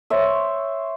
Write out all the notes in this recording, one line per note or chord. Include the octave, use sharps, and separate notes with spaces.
C5 C#5 E5